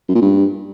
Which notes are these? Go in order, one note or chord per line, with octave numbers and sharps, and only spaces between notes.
F#2
A#2
G2